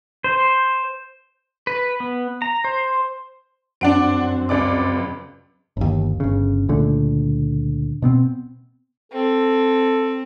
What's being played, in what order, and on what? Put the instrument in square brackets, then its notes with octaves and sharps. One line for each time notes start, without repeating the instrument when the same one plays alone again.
[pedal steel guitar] C5
B4
B3
A#5
C5
[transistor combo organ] F#2 C4 [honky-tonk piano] D4 F#5 D7
[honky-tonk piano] C#2 D5 D6
[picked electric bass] G1 D#2
G1 C#3
C#2 A#2 D3 A3
B2 B3 C4
[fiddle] C4 [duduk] A4